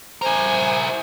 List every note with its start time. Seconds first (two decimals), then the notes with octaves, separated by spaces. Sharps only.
0.22 E4 A#4 C5 G#5